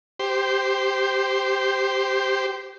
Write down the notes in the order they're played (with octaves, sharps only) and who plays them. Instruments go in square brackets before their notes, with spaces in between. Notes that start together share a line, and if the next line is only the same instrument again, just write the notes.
[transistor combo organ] G4 C5